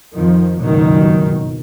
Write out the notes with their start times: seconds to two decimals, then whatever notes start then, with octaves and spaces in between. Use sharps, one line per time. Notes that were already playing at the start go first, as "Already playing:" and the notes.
0.13 F2 D#3 F3
0.61 F#1 C#2 G2 B2 D#3 F#3